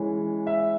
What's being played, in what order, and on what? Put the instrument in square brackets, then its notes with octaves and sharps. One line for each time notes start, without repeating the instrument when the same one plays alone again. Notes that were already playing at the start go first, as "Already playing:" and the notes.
Already playing: [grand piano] E3 G#3 C#4
E5